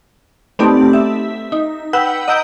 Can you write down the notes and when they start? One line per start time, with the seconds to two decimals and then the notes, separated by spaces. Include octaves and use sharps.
0.59 A3 B3 C4 D#4 G4 D5
0.93 E5
1.52 D#4
1.93 B4 F#5 G5 E6 G6
2.28 D#5 F#5 A#5 E6 G6 D7